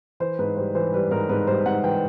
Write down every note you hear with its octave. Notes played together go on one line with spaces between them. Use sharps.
E3 C5
G#2 B4
G3 C5
E3 C5
G3 B4
G#2 A#4
G#2 B4
G3 C5
G#2 F#5
E3 G5